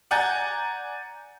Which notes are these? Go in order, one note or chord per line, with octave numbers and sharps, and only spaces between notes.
D5 F#5 G#5 A#5 G6 A6